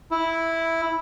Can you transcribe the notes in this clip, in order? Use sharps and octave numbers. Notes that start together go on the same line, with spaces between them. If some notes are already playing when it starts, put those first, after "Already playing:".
E4